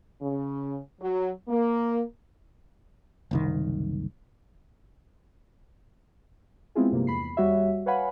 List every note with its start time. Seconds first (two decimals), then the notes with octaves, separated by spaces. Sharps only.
0.21 C#3
1.01 F#3
1.49 A#3
3.31 F#1 C2 D#3
6.75 G#3 B3 C4 E4 F4 G#4
6.91 A#1 G2 C3 A#3
7.07 E2 B5 C7
7.37 D#2 G3 F#4 C#5 E5
7.86 B4 C#5 F5 F#5 G#5 B5